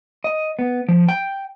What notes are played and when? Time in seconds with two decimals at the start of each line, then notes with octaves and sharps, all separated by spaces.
0.24 D#5
0.59 B3
0.89 F3
1.08 G5